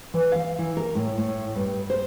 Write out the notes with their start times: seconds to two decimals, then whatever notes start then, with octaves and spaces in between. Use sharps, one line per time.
0.14 E3
0.32 F5
0.59 E3
0.77 A#4
0.95 A2
1.18 A2
1.56 G2
1.90 C5